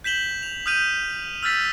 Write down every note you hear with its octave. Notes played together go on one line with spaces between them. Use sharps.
G6 B6 E7 F#7 G7
F7
D#6 F6 G6 D#7
E6 F6 G6 A6 B6 F#7